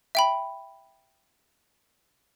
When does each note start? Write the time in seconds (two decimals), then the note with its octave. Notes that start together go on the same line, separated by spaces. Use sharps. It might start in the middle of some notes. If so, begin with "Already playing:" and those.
0.15 E5 G5 B5